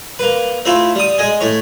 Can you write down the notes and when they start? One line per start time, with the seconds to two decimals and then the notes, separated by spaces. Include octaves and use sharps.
0.19 A#3 B4
0.65 A3 C4 E4 F4
0.95 G3 D#6
1.18 G#3 D#5 G#5
1.41 A2 C#5